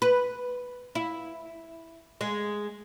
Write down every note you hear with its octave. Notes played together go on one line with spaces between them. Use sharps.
B4
E4
G#3